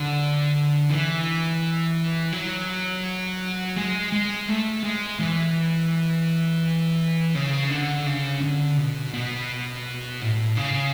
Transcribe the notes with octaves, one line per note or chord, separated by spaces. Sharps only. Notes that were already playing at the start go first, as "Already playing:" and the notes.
Already playing: D3
E3
F#3
G#3
G#3
A3
G#3
E3
C#3
D3
C#3
D3
B2
B2
A2
C#3